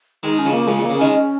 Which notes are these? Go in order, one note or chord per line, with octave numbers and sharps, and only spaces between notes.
D#3 G#3 D#4
C#4
C#3 F3
A#3
C#3 F3 G#3
A#2 A#3
C#3
D#3 G#3 C#4
C#4